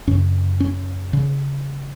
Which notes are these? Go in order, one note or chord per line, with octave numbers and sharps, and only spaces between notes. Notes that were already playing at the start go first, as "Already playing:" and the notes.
F#2 C#3 C#4
C#4
C#3